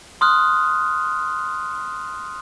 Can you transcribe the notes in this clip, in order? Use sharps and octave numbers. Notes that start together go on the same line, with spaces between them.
C6 D#6 F6 F#6